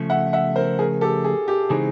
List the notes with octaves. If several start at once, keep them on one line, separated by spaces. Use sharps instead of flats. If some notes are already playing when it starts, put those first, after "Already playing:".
Already playing: C#3 F3 A3
E5 F#5
E5 F#5
A#4 C5
G#4 A#4
G4 A4
G#4
G4
C#3 E3 G#3 C4 D#4 G#4